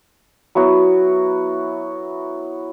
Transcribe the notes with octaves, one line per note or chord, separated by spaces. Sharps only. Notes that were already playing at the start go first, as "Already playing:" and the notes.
F#3 B3 E4 F#4